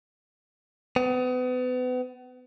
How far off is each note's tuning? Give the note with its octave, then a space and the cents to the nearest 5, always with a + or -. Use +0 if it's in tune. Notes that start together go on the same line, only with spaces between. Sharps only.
B3 +35